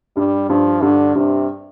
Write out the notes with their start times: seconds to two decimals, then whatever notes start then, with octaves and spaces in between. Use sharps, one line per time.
0.16 G2 G3
0.49 G2 F3
0.82 G2 D3
1.15 G2 C3